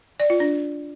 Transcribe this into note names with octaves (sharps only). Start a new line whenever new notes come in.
D5
F4
D4